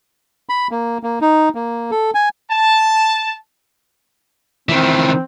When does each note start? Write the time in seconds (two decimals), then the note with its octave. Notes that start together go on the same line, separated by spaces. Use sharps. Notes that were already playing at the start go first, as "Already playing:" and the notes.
0.49 B5
0.71 A#3
1.03 A#3
1.21 D#4
1.55 A#3
1.91 A4
2.15 G#5
2.50 A5
4.69 D#3 E3 C4